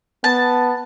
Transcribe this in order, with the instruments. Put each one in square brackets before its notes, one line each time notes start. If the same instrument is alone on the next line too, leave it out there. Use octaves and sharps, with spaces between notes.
[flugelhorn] B3 [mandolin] A5